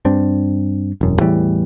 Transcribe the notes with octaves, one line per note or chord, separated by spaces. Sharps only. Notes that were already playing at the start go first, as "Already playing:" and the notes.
G2 C4 D4
E1 F#2
E2 A2 E3 G3